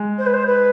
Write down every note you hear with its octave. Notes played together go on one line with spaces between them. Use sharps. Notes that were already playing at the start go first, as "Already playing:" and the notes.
Already playing: G#3
C5
B4
C5
B4